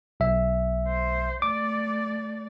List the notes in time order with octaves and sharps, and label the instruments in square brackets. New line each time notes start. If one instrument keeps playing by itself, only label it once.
[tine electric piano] B1 E5
[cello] C5
[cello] A3 D5 [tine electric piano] D6